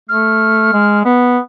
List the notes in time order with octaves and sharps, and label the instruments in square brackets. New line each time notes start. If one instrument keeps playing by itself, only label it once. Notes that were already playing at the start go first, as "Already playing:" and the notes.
[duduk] A3 [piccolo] F6
[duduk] G#3
B3